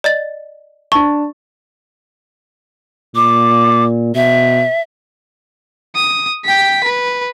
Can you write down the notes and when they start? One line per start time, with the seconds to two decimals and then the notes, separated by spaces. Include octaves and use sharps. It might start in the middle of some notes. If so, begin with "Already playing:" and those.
0.04 D5 D#5 A6
0.92 D4 A5 C#6
3.16 A#2 D6
4.15 B2 E5
5.96 D#6
6.45 G5 B6
6.84 B4